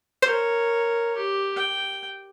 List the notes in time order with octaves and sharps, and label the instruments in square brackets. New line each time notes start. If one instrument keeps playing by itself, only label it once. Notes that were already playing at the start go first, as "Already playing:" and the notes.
[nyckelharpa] A#4 C#5 [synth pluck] C5
[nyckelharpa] G4
G5